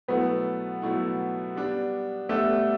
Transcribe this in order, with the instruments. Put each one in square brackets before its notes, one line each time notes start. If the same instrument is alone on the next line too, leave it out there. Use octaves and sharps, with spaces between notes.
[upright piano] B2 F#3 A3 E4 [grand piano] B3
[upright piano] B2 F#3 A3 E4
G3 B3 D4
[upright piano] G3 B3 D4 [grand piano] A3